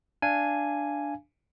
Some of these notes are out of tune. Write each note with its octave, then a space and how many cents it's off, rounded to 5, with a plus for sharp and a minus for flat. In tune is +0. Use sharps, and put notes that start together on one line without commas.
D4 +0 F5 -25 G#5 +0